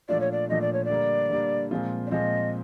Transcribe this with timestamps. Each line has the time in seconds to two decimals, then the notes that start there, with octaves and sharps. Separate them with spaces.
0.09 A#2 F3 A3 D4 F4 D5
0.20 C#5
0.32 D5
0.49 A#2 F3 A3 D4 F4 D#5
0.61 D5
0.73 C#5
0.85 D5
0.90 D3 G3 A#3
1.30 D3 G3 A#3
1.71 A#2 F3 G#3 C4 F4
2.06 D5
2.11 A#2 F3 G#3 C4 F4 D#5